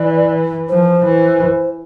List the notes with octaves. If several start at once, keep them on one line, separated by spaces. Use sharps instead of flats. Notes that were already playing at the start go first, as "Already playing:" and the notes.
Already playing: E3 D5
F3 C5
E3